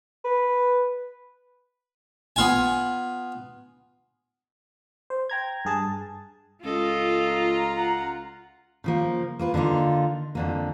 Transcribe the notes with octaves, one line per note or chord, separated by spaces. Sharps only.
B4
B3 F4 G#5
C5
G5 A#5 G#6
G2 G#4 A5
C#2 F4 A4 D#5
A#5
F#5
C#3 F3 A#3
A#3 F4 B4
D3 A#3 D#4 F4
F2 D3 A#3